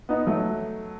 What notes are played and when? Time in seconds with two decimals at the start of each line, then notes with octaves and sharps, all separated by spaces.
0.09 B3 D#4
0.27 F#3 A3